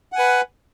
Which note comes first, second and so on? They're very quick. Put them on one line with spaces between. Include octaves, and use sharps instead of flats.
F#5 G#5 B4